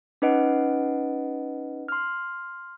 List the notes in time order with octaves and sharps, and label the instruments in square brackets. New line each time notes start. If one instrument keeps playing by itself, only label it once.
[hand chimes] C#4 D#4 B4 D#5 F#5 D7
C6 F6